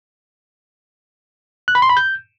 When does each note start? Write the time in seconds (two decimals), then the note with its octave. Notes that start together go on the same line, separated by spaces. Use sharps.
1.68 F#6
1.75 B5
1.82 C6
1.89 B5
1.97 G6